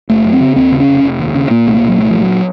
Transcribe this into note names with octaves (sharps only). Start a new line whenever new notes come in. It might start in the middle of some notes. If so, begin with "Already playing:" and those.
F#1 A3
F#2
C4
C#3
D#2 C4
C#3
C#4
F1
F1
D#2
C#3
A#2 A#3
C2 A3
A#3
A#2
F#3
C2 A3
A#2 F3
F#3